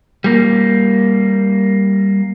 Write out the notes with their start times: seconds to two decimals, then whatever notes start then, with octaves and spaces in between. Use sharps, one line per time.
0.24 G3 A#3